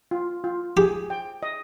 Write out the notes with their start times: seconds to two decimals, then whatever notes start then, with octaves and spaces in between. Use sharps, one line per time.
0.11 F4
0.44 F4
0.77 G4 G#4
1.10 G5
1.43 D#5